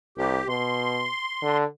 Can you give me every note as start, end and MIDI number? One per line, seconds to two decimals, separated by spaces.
0.17 0.41 36
0.17 0.48 67
0.49 1.08 47
0.49 1.58 84
1.42 1.65 50